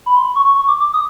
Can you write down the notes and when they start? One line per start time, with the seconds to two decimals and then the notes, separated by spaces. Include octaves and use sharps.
0.06 B5
0.16 C6
0.36 C#6
0.55 C#6
0.68 D6
0.81 D6
0.93 D#6